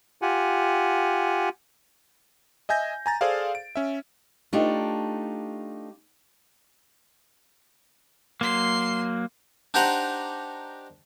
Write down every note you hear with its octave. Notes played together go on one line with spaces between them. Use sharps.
F4 G4 F#5 G#5
D#5 E5 G#5 G6 A#6
G#5 A#5 A6
G#4 A4 C5 D5 F5
D7
C#4 E5
A3 D4 D#4 F4 G4
F#3 A#3 C6 C7
D4 D#4 G4 C5 F#5 A#5